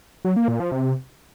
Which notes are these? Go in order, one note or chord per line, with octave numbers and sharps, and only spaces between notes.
F#3
A#3
A#2
F3
C3